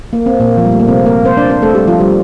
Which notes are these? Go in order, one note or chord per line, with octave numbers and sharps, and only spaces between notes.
A#3
C4
A#2 A#3
F3
G3
A3
A#3
C3 C4
A#3 A#4
C4 C5
D4 D5
C4 C5
A3 A4
G3 G4
F3 F4
G3 G4